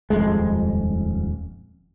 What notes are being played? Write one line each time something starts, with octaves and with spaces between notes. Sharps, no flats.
D#1 B1 F2 G#3